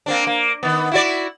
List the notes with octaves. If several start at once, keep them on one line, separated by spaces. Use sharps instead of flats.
A#3 C4 D4
A#3
D#3 B3
E4 F#4 D5